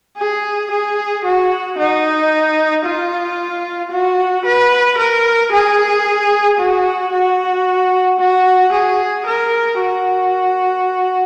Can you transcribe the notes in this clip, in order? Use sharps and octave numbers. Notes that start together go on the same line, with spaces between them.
G#4
G#4
F#4
D#4
F4
F#4
B4
A#4
G#4
F#4
F#4
F#4
G#4
A#4
F#4